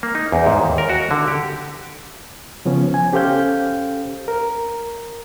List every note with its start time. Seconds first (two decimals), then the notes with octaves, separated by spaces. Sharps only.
0.03 A#3
0.15 D#4
0.32 E2
0.46 G#2
0.60 D#2
0.78 A#4
0.90 F#4
1.11 D3
1.28 G4
2.65 C#3 F3 B3 C#4
2.94 G#5
3.13 C#4 G4 A4 C5 F5 G6
4.28 A#4